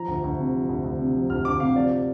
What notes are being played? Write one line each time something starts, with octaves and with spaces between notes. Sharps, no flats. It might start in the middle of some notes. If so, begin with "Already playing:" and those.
Already playing: F3 A#5
D2
D2
C3
F3
D2
D2
C3
F3
D2 F6
D2 D6
C3 F5
F3 D5